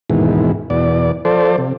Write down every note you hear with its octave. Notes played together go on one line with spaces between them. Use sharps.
D#2 G#2 B2 E3
E2 B2 D5
F3 A4 C5 D5
C3